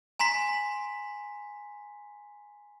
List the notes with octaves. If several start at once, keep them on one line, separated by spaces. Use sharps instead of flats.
G#5 A#5 C6 B6